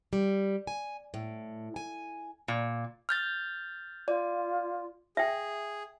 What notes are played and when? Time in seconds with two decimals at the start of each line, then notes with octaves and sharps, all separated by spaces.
0.13 G3
0.67 G#5
1.14 A2
1.76 G#5
2.48 A#2
3.09 F6 G6 A6
4.08 F4 D5
5.17 G#4 E5 G5